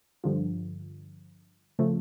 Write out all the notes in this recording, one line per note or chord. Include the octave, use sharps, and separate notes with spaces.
G2 D3 F3
C#3 F3 A3